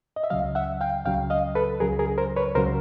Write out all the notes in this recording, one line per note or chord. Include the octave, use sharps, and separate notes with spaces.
D#5
E5
C#2 C#3 F#3 D#5 F5
E5 F#5
F5 G5
C#2 C#3 F#3 F5 G5
D#5 F5
A4 B4
C#2 C#3 F#3 G#4 A#4
G#4 A#4
A#4 C5
B4 C#5
C#2 C#3 F#3 A#4 C5